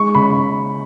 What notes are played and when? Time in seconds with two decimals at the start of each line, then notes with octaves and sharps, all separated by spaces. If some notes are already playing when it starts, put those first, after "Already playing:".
Already playing: G#3 C#6
0.15 C#3 B5